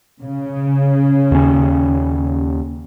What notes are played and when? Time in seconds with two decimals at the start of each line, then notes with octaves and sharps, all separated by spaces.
0.23 C#3
1.32 D#2 C#4